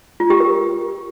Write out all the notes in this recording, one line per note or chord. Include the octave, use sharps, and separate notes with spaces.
F4
G4
A#4